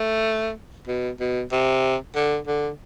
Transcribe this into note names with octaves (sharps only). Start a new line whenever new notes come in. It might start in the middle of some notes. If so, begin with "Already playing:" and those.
Already playing: A3
B2
B2
C3
D3
D3